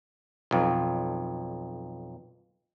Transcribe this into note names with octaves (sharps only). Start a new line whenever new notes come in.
B1 F2